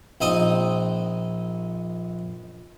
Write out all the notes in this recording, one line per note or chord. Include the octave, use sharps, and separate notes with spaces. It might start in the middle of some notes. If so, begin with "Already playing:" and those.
A#1 C4 D#4 D#5 D#6